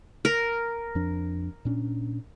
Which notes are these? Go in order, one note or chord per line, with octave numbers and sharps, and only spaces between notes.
A#4
F2 F3 D4
A#2 C#4 D4